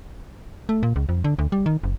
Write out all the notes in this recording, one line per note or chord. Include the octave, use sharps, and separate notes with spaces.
A3
A#2
C#2
F2
D3
D2
G3
D#3
F#1